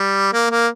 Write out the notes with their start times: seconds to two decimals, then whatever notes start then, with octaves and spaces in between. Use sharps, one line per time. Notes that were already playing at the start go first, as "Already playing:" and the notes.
Already playing: G3
0.33 A#3
0.50 A#3